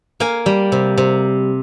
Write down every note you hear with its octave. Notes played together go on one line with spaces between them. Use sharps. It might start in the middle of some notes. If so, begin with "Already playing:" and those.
A#3 F5 G#5
G3
C3
C3